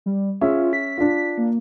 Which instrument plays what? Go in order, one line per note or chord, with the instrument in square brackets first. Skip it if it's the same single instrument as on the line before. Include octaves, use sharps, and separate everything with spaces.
[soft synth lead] G3
[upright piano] C#4 G#4 E5 [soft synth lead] F4
[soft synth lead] B6
[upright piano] D4 F4
[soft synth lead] A#3